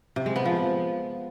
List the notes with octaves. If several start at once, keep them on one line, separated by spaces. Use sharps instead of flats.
C3
G#3
B3
F3